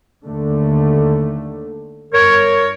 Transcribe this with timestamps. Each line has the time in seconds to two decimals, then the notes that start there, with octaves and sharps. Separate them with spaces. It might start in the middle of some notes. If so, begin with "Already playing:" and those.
0.24 D#2 D3 A3
2.13 G1 A#4 C#5